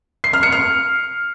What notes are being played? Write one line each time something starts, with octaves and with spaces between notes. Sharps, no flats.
C7
F6
C#7
F6